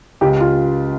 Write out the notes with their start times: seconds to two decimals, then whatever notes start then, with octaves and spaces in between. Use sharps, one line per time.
0.21 C#2 G4
0.40 F4